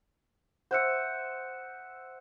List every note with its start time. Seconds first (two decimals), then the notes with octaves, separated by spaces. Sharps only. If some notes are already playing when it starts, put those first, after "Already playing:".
0.71 C5 E5 F#5 D#6 F#6 C#7